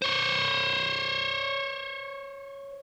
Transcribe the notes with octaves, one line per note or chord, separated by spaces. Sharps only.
C5 C#5